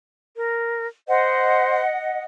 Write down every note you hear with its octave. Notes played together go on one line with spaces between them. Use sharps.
A#4
C5 D#5 F#5